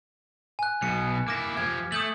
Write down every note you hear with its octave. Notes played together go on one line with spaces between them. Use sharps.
G#5 F#6
B1 B2 C#7
A#3 E4 D6 A#6
F3 G4 G#6
A3 D#6 G6 F#7